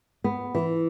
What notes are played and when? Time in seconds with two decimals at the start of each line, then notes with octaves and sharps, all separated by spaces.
0.24 B3
0.55 E3